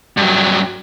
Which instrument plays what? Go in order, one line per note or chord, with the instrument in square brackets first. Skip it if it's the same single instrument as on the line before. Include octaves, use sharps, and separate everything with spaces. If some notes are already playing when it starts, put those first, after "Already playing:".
[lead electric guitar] G2 F#3